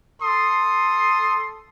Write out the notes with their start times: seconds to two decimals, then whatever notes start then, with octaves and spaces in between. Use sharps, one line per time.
0.22 A4 C6 D#6